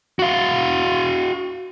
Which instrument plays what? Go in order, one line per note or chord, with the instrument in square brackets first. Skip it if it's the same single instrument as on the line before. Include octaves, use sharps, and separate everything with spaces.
[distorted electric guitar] F#4 F5